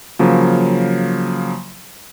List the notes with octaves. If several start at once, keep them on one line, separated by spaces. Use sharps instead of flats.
C#3 F3 F#3 A#3